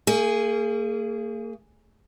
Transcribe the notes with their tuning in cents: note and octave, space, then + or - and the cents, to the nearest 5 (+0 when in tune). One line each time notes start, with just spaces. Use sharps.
A#3 -35 G#4 +0